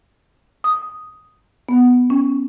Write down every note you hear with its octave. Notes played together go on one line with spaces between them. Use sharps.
D#6
B3
C#4